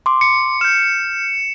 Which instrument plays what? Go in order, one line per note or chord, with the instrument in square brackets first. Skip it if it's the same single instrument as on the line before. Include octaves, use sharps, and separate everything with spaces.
[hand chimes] C6 D6
[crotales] C#7
[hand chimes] F6 G6 [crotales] E7